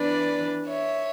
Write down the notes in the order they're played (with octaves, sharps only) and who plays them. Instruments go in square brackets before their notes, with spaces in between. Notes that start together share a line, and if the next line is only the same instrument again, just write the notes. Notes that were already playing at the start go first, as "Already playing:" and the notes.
Already playing: [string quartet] E3 B3 D4 B4 D5
C#5 E5